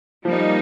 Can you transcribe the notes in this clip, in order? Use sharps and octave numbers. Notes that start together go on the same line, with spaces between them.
F3 G3 A#3 D#4